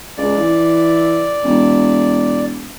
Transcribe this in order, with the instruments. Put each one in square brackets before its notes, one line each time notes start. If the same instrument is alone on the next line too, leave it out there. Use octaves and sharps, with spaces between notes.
[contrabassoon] C#2 [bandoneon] D5
[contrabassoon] E3
E1